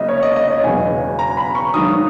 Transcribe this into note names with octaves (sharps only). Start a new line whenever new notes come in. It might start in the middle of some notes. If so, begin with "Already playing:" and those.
Already playing: C#2 C#3 F#3 A#3 D#5 E5
C#5
D#5
D#5
C#5
E1 E2 C#3 F#3 G#5
A#5
B5
C#6
G#1 G#2 D#3 F#3 D#6